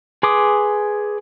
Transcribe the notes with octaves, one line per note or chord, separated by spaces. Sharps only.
G#4 B4 C6 D6 D#6